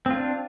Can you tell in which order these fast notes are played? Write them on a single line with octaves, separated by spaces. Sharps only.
C4 F4 D4